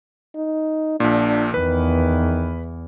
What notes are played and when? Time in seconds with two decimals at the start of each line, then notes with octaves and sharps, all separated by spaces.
0.36 D#4
1.00 A#1 A#2 D4
1.54 E2 D#3 B4